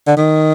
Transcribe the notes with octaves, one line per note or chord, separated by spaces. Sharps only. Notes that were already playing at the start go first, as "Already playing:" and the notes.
D3
D#3